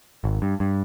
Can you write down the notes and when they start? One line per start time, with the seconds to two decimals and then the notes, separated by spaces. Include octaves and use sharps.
0.24 G#1
0.42 G2
0.60 G2